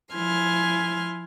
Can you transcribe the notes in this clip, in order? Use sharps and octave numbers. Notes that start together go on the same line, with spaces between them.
F3 E4 G#5 C6 F6